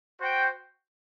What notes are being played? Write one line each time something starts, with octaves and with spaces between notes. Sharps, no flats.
F#4 C5 G5